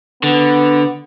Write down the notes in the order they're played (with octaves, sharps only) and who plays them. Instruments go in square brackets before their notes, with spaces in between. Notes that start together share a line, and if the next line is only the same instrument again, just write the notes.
[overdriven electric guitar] D3 [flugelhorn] B3